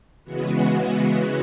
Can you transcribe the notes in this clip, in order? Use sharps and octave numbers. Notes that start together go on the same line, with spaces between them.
C#3 E3 G#3 B3 F#4